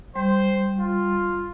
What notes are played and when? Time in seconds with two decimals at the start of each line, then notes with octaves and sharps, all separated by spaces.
0.16 G3 C5
0.79 F4